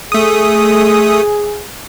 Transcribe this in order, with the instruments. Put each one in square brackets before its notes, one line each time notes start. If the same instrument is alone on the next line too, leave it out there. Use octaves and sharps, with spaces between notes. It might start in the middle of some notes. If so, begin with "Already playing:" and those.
[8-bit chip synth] A3 D#6 [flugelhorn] G#4